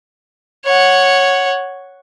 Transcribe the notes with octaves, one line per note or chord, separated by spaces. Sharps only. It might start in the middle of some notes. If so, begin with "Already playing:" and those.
C#5 F#5